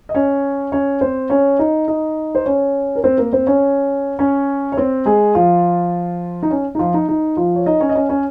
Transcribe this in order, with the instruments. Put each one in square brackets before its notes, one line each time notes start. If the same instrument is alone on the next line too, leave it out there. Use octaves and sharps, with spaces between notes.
[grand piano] D#5
C#4 C#5
C#4 C#5
C4 C5
C#4 C#5
D#4 D#5
D#4 D#5
C5
C#4 C#5
A#4
C4 C5
A#3 A#4
C4 C5
C#4 C#5
C#4 C#5
C#5
C4 C5
G#3 G#4
F3 F4
D#4
C#4
D#4
F3 F4
D#4
D#4
F3 F4
C#5
D#4 D#5
C#4 C#5
D#5
C#4 C#5
C#4 C#5